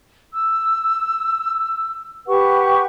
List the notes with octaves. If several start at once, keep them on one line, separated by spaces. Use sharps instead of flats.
E6
G4 B4 F#5 C#6